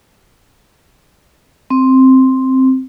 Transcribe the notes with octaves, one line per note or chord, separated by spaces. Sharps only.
C4